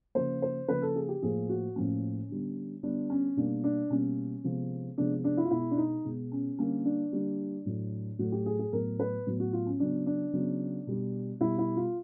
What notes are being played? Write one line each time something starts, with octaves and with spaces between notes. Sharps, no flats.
C#3 F3 A#3 C5
C5
C#3 F3 A#3 B4
A4
G#4
G4
A2 F3 A#3 G#4
F#4
A2 F3 A#3 C#4
D3 G3 B3
D3 G3 B3 D4
C#4
B2 G3 A#3 D4
D4
B2 G3 A#3 C#4
C3 F3 G#3 B3
C3 F3 G#3 B3 D4
D4
E4
F4
B2 G#3 B3 E4
D4
D#4
B2 G#3 B3
C#4
D3 G3 A#3 C#4
D4
D3 G3 A#3
A2 F#3 A3
A2 F#3 A3 F#4
G4
G#4
G#4
A2 F#3 B3 A#4
B4
A2 F#3 B3
F#4
F4
C#4
C#3 F#3 B3 D4
D4
C#3 F#3 B3
B2 G3 B3
B2 G3 B3 E4
E4
F4